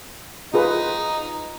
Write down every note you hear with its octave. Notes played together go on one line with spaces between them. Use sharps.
D#4 F4 G#4 B4